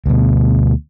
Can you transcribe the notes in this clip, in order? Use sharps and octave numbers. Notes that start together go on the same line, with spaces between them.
D2 B2